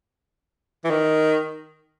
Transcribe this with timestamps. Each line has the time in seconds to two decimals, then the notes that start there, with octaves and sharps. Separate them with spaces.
0.84 E3
0.90 D#3